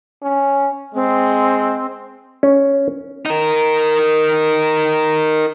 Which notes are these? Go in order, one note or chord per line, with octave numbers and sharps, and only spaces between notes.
C#4
G#3 C4
C#4
D#4 A#4